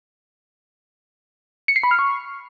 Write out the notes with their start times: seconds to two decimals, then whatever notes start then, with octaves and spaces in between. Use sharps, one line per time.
1.68 C#7
1.76 C7
1.83 B5
1.91 F6
1.99 C#6